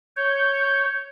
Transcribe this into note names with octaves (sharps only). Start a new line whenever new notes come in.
C#5 G6